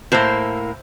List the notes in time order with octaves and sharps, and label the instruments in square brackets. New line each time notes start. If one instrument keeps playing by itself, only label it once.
[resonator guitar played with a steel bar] A2 A#3 [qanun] C5 E5